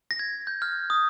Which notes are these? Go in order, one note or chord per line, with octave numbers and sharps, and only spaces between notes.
A#6
G#6
G6
F6
D#6